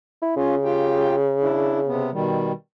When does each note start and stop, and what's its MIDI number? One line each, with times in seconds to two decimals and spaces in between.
0.22 0.33 64
0.36 2.15 49
0.36 0.55 61
0.36 0.55 65
0.65 1.15 65
0.65 1.15 67
0.65 1.15 79
1.42 1.80 62
1.42 1.80 64
1.87 2.10 48
1.87 2.10 59
2.13 2.52 47
2.13 2.52 51
2.13 2.52 55